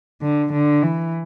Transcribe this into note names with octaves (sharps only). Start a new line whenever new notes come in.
D3
D3
E3